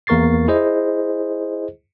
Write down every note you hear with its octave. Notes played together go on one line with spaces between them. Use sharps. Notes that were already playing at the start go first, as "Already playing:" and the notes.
E2 A#3 A#4 C#6 A6 C7
E4 G#4 C5 D#5